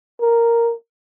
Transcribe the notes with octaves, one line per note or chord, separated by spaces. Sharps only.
A#4